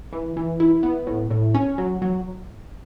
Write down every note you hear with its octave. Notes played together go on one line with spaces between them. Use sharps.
E3
E3
E4
B3
A2
A2
C#4
F#3
F#3